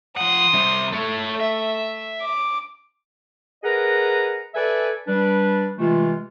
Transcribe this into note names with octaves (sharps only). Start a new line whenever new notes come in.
F3 F#5 C6 D#6
C3 G3
A3 A4 C#5
E5
D6
G#4 A#4 B4 D#5 F#5 A#5
A4 B4 D5 E5 G#5
G3 D4 B4
C3 E3 G#3 A3 F4